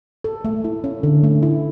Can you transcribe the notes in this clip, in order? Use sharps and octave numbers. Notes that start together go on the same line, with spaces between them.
A4
A3
E4
C#4
D3
A3
E4